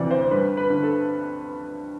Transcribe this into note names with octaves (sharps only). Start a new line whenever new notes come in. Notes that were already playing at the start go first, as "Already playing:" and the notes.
Already playing: D2 C3 E3 D5
C5
G2 B4
B4
D3
A4